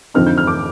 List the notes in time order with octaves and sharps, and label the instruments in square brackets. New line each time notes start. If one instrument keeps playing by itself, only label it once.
[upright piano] F2 D3 F3 C4 D#4 F6
G6
F6
D6